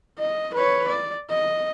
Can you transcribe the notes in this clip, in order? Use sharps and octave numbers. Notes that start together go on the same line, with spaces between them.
D#5
B4 C#5
D5
D#5